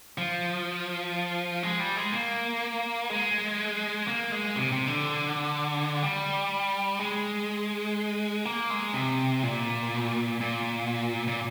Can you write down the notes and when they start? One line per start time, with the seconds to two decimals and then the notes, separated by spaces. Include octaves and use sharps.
0.18 F3
1.63 G#3
1.80 G3
1.96 G#3
2.12 A#3
3.10 G#3
4.08 A#3
4.32 G#3
4.56 C3
4.72 C3
4.88 D3
6.02 G3
6.99 G#3
8.45 A#3
8.70 G#3
8.94 C3
9.43 A#2
10.41 A#2
11.27 A#2